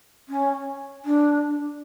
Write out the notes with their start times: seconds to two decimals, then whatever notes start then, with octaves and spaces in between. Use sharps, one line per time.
0.28 C#4
1.04 D4